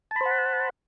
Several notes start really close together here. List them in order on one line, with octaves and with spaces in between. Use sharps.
A5 B5 C5 F#5